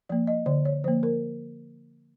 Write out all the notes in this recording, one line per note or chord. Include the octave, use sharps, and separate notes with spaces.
F3 A#3 D5
D#5
D3 D5
C#5
F3 A#3 C5
A#4